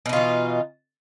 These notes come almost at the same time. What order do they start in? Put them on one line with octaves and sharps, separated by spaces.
B2 D#4 F4 E3